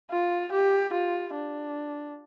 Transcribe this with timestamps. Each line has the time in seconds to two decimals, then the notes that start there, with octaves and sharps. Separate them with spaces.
0.11 F4
0.52 G4
0.94 F4
1.35 D4